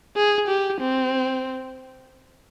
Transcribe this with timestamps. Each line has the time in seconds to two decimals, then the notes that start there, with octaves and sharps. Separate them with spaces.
0.16 G#4
0.48 G4
0.80 C4